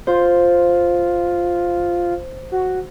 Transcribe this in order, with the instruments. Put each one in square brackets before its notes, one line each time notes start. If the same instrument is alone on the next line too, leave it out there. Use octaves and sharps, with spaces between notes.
[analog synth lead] F4 [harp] C5
[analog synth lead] F#4